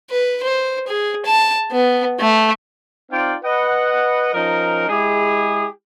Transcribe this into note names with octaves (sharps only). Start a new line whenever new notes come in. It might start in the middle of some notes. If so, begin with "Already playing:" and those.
B4
C5
G#4
A5
B3
A3
C4 D#4 F4 D5 F5 G5
B4 D#5 F#5
F3 C#4 D#4 A#4
G#3 E4 G4 G#4